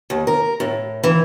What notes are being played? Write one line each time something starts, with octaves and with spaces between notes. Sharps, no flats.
D#2
A#4
A2
E3